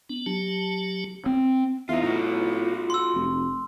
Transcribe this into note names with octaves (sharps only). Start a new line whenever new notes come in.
B3 D4
F#3 G4 A5
C4
E2 D#4 F4 E5
A2 D#4 F4 F#4
C6 E6
F1